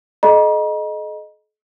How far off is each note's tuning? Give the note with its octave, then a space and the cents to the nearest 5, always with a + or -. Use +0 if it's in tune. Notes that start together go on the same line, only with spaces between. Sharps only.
A4 -45 D#5 -15 A#5 +40